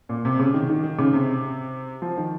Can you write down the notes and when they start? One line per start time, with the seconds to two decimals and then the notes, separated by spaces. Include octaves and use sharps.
0.09 A#2
0.25 C3
0.39 C#3
0.54 D#3
0.70 D#3
0.83 D#3
0.99 C#3
1.13 C3
2.02 F3
2.18 D#3